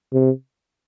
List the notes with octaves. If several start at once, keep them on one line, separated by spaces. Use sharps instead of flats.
C3